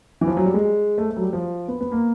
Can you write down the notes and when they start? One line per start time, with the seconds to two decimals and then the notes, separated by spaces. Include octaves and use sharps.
0.21 E3
0.27 F3
0.37 F#3
0.46 G3
0.54 G#3
0.98 A3
1.10 A3
1.17 F#3
1.21 G3
1.33 F3
1.68 B3
1.81 B3
1.92 A#3